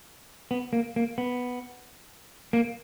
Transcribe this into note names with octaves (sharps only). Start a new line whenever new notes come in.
B3
A#3
A#3
B3
A#3